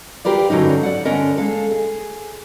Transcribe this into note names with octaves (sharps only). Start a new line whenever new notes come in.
F4 G4 A#4 B4 D5
G2 D3 F#3 C#4 D#4
D5 F#5
G2 D3 C#4 A#4 D#5
G#3 A#3 A4
G#4